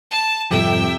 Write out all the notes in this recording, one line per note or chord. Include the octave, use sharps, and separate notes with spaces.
A5
F2 G#2 C3 G3 A4 E5 G5